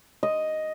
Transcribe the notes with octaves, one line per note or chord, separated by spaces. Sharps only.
D#5